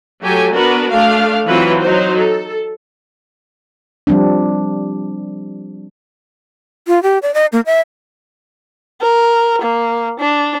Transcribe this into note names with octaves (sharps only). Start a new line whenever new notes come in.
F#3 A3 G4 A4 G#5
B3 D4 F#4 A#4 B4
A3 D4 F5
E3 F#3 C4 E4 F4 B4
F#3 D#4 C5
A4
F3 G3 C4 D4
F4
G4
D5
D#5
A#3
E5
A#4
A#3
D4